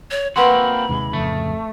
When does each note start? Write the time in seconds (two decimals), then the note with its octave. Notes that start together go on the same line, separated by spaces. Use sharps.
0.11 C#5
0.36 A#3 C4 F#4 B4 F#5 B5 C6
0.89 D#2 C3 G#3
1.13 D1 F2 C#3 A3